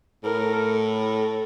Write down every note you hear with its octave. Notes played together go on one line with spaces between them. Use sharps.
A2 A#4
A4